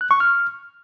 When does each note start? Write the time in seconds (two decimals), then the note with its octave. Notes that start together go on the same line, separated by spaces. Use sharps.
0.01 F#6
0.11 C#6
0.20 F6